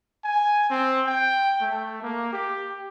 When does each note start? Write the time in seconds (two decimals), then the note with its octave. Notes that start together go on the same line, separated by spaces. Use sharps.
0.24 G#5
0.70 C4
1.07 G5
1.62 A3
2.02 A#3
2.33 G4